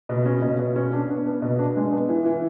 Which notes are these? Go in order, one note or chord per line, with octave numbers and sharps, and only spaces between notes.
B2
C#4
B2
B2
C#4
D4
B3
B3
B2
D4
G#3
B3
E3
E3